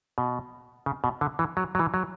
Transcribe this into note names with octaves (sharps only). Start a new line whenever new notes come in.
B2
C#3
B2
D3
E3
F#3
F#3
E3
F#3